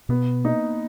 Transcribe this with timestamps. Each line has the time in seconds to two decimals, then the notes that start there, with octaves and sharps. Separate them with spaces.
0.09 B2 B3
0.44 A#3 D#4